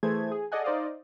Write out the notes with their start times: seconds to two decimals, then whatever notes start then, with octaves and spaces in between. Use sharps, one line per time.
0.03 E3 A3 G#4 C5 G#6
0.32 G#4
0.52 G#4 A4 D5 D#5 F#5 G#5
0.64 D#4 C5 D5 D#5 F5